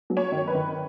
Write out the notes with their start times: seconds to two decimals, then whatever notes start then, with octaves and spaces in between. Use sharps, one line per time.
0.10 F#3
0.17 C#5
0.32 D#3
0.47 B4
0.55 D#3